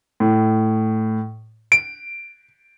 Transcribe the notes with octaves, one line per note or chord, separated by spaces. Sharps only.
A2
D7